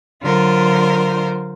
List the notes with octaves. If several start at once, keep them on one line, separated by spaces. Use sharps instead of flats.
D3 F#3 F4 A#4 C5